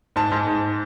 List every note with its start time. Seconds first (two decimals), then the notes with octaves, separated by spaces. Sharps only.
0.16 G#2 A5
0.32 G#2
0.47 G#2